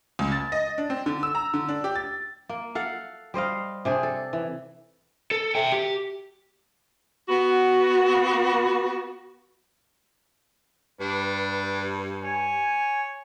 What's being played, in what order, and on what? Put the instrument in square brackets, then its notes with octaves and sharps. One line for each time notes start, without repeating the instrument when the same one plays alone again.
[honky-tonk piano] C#2
A6
D#5
D4
C4
D3
E6
A#5
D3
D4
G4
A6
[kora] A#3
A4 F5 F#5
G3 C5 D#5 F5
C3 D4 G#4
A4
E3
[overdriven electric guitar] A4
E5 G5
G4
[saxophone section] B3 F#4
[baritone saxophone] G2 [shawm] D4 [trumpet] B4
[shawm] C#5 [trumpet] G#5